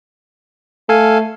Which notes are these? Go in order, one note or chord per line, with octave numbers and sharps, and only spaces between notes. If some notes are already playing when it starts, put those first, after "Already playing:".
A3 A4 F5 G#5